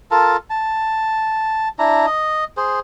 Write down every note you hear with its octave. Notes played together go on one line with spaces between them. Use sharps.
F4 A4 A#4 A5
A5
D4 E4 A#5
D#5
G#4 C5